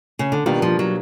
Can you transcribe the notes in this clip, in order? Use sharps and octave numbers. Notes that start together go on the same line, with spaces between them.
C#3
D3
B2 D#3 G3 A#3 D4 F4
F3
F#3